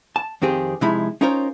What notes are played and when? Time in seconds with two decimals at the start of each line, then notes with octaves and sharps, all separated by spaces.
0.16 A5
0.42 F2 D#3 C4 G4 G#4
0.81 C3 F3 G#3 D#4 E4 B5
1.21 C#4 D#4 F4 A#4 C5 C#5